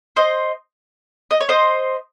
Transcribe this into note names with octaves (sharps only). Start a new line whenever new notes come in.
C5 D#5
D#5
C#5
C5 D#5